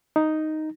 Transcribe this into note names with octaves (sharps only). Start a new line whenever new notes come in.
D#4